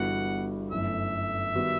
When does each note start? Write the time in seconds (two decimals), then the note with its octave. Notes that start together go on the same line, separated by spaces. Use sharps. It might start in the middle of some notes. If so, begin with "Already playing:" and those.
Already playing: G1 G2 E3 B3 F#4 F#5
0.71 G1 F#2 E3 A3 E5
1.55 D#3 G3 B3 F#4